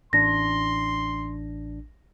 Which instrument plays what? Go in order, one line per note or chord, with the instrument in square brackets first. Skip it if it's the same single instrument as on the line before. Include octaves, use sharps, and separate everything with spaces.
[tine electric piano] A1 D4 [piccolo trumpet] C6 [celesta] A#6